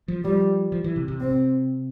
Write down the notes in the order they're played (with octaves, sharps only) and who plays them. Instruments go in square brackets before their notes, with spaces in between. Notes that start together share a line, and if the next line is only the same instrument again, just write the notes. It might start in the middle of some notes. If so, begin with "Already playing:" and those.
[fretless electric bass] F3
[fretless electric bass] F3 [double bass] G3
[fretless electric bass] F3
E3
C3
C3
[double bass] C4